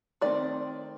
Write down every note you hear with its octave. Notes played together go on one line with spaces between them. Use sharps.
D#3 A3 C4 D5